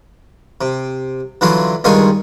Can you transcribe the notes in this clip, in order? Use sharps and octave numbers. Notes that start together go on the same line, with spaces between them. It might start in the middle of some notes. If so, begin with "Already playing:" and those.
C3
D3 E3 F#3 E4 F4
C#2 G2 D#3 F4 G#5 C#6